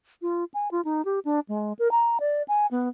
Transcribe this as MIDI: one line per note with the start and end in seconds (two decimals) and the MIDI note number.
0.22 0.44 65
0.54 0.71 80
0.71 0.81 65
0.85 1.04 63
1.05 1.19 67
1.25 1.40 62
1.49 1.73 56
1.79 1.91 70
1.91 2.18 82
2.20 2.42 74
2.48 2.66 80
2.71 2.88 59